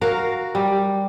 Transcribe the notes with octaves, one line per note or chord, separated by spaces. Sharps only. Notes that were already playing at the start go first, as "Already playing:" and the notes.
F#4 A#4 F5
G3